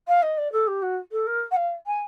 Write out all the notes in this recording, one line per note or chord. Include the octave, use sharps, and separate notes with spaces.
F5
D#5
D5
A4
G4
F#4
A4
A#4
F#5
F5
G#5